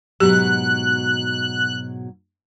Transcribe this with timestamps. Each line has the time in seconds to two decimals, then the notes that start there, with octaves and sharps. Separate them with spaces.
0.20 G#2 B2 F#3 G4 F#6